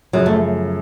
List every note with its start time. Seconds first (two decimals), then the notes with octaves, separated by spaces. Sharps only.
0.13 F#2 C#3 F3 F#3
0.26 A3